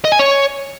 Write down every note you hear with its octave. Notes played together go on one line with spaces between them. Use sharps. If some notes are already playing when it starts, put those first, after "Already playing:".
D#5
G#5
C#5